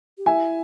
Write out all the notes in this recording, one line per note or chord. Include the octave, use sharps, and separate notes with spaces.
G4
E4 E5 G#5